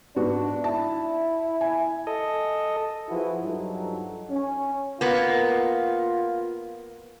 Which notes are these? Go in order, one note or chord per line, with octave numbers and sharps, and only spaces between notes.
G#2 B3 D4 F#4
E4 A5
G#5
A4 D#5
F3 E4 F#4 G#4 B4
G2 F3 F#3 D#4 A4
C#4
A#3 B3 F4